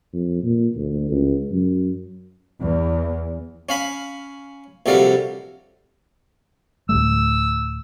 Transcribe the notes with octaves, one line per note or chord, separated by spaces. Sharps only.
F2
A#2
D2
C#2
F#2
E2
C#4 F5 B5
A#1 C3 F#3 G3 A4 F5
D1 G#1 A3 E6